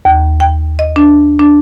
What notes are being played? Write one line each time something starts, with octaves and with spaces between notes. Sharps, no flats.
D#2
G5
D#5
D4
D4